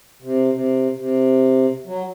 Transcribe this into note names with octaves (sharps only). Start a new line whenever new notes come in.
C3
C3
C3
F#3